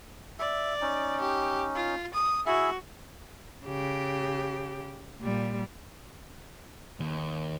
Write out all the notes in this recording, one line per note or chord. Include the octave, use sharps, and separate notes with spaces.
D5 E5
C#4 D#4
G4
F4
D#6
E4 F#4 G#4 E5
C#3 G4
A#2 G3
D#2